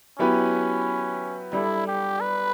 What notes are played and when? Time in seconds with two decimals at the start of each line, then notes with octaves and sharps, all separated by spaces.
0.18 F#3 B3 C#4 E4 G4 B4
1.53 G3 D4 E4 A4
1.88 G4
2.21 B4